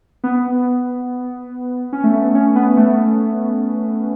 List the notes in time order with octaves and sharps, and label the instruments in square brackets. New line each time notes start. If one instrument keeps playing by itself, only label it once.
[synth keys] B3
C#4
A3
B3
C#4
B3
A3